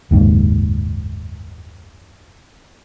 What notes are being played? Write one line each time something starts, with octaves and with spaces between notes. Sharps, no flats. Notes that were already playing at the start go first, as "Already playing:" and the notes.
F#1 D#2 G#2